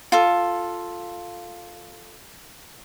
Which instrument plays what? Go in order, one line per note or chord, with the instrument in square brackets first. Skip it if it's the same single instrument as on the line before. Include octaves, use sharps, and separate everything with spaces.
[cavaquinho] F4 A4